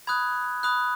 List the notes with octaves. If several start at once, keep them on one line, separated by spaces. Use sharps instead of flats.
B5 D#6 F#6 G#6
B5 D#6 F#6